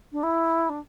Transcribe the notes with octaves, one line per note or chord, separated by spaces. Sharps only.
D4
E4
D4